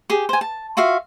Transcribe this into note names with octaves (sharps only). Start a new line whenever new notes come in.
G4 G#4
C5 G#5
A5
F4 F#4 E5 F5